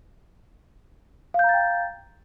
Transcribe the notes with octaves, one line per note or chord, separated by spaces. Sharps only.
F5 G5 A#5 G6 A6